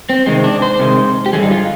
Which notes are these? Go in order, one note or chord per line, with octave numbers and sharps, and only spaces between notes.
C4
C3 D#3 G#3 C4
D4
C5
C3 D#3 G#3
G4
G2 D3 F3 G#4
D#4
F4